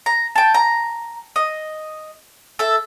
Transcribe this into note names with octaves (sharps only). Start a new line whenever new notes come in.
A#5
G5 A5
A#5
D#5
A4 E5